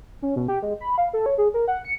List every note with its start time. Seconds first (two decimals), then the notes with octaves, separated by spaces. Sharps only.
0.22 C#4
0.36 B2
0.48 G4
0.62 G#3
0.81 B5
0.98 F5
1.13 A4
1.26 C#5
1.38 G#4
1.54 A#4
1.68 F#5
1.85 C#7